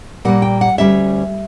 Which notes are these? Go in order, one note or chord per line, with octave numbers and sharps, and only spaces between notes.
A#2 G3 A#3 F#5
G5
F#5
D2 C#3 G3 C#4 E5